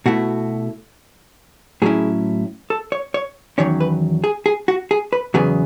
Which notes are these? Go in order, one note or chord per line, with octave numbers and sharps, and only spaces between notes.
B2 A3 E4 F#4
A2 F#3 C#4 E4 G#4
A4
C#5
C#5
E2 D#3 F#3 C#4 C#5
B4
G#4
G#4
F#4
G#4
B4
E2 C#3 F#3 B3 G#4